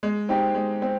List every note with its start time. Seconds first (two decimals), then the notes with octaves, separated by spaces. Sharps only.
0.03 G#3
0.29 C4 D#4 G4
0.54 G#3
0.82 C4